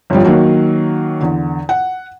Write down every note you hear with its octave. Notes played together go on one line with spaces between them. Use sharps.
G1 F2 F3 G3
D#3 F#3 A#3 F#4
E2 D3
F#5